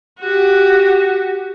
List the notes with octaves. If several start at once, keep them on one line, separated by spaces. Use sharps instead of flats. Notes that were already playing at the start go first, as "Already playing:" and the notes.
F#4 G4